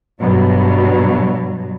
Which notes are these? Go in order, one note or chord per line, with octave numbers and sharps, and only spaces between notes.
G2 B2 F#3